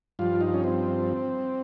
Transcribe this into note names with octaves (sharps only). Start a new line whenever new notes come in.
G2 F3 F4
D#4
C#4
C4